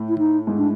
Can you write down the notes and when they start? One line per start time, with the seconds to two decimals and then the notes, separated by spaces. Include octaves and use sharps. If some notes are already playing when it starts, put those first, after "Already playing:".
Already playing: A2
0.09 E4
0.18 D#4
0.47 G#2
0.58 D4